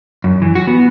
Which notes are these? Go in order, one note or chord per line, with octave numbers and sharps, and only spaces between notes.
F#2
E3
F#4
B3